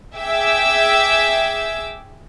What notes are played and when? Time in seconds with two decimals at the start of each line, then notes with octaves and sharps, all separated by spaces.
0.17 G#4 E5 G5 D6 E6